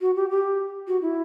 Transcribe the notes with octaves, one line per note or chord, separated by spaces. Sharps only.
F#4
G4
G4
F#4
E4